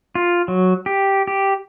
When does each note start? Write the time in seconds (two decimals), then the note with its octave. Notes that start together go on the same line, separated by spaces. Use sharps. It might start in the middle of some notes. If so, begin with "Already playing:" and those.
0.15 F4
0.48 F#3
0.86 G4
1.27 G4